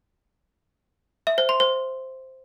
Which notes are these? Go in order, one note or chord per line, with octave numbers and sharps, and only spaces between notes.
E5
C5
C6
C5